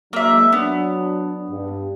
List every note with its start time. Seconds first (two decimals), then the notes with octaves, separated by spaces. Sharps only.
0.13 F#3 G#3 A#3 D4 E5
0.52 F#3 B3 D4
1.50 G2